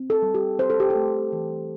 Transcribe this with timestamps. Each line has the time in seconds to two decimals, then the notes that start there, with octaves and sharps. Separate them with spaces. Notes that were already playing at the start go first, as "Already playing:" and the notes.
Already playing: C4
0.10 A4
0.22 G3
0.34 G4
0.59 C4 C5
0.70 A4
0.80 G4
0.90 A4
0.95 A3
1.33 E3